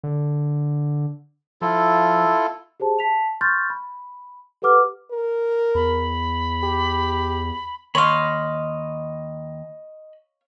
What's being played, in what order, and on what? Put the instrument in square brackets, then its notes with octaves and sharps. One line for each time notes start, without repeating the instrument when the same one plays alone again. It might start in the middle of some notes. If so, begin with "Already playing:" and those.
[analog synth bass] D3
[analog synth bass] F3 [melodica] E4 F4 A4
[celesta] G4 G#4 C5 A5
A5 B6 F7
C6 C#6 F6 G6 A6
B5
G4 A4 B4 F#5 D6 F6
[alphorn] A#4
[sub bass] E2 [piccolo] B5
[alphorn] G4
[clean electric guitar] D#2 C6 [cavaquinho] C#5 F5 [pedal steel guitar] D#5 B5